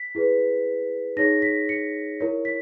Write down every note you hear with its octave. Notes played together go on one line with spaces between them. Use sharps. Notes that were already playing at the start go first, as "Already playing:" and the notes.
Already playing: B6
E4 G#4 B4
D#4 G#4 C#5 A#6
B6
C#7
E4 A#4 C#5
B6